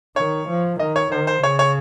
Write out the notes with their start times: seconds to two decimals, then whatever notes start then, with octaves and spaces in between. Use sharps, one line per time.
0.16 D#3 C#5
0.49 F3
0.79 D#3 D#5
0.96 C#5
1.12 D#3 C5
1.27 C5
1.42 C#3 C#5
1.59 C#5